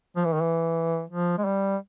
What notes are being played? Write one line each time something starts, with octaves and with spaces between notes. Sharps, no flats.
F3
E3
D#3
E3
F3
G#3
G3